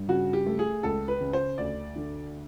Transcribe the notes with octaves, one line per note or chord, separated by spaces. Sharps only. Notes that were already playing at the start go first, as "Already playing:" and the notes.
Already playing: G2
C#3 F#4
G4
A3
G#4
C#2 A4
B4
C#3
C5
D2 D5
D3